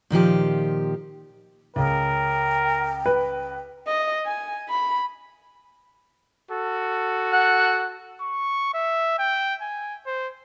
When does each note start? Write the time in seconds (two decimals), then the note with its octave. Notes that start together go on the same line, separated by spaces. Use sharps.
0.10 A#2 D#3 F3 G4
1.76 C#2 C#3 A#4 G5
3.06 B4
3.87 D#5
4.26 G#5
4.69 B5
6.51 F#4 A4
7.32 F#5
8.21 C#6
8.74 E5
9.19 G5
9.61 G#5
10.06 C5